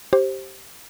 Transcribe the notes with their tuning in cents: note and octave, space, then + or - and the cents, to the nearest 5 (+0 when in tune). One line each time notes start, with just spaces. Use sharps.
G4 -15 C5 +20